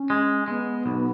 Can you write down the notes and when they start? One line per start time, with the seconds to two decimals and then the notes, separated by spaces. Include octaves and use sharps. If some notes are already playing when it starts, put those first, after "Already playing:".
Already playing: C#4
0.10 G#3
0.48 G#3 B3
0.86 B1